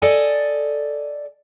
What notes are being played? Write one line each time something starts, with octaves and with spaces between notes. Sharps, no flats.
A4 D5 D#5 G#5